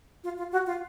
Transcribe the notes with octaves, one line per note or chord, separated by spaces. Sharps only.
F4
F4
F#4
F4